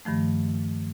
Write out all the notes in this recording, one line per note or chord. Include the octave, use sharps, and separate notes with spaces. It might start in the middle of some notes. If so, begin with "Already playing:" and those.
G2 D#3 F3 A3